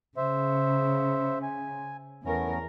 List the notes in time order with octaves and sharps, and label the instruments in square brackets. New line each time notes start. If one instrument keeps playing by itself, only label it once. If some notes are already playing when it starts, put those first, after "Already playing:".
[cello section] C#3 [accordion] C5 E5
[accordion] G#5
[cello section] E2 A#4 [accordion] A3 B3 C#4